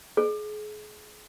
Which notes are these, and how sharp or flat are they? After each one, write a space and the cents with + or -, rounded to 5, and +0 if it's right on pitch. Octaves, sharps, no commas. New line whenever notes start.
G#4 +30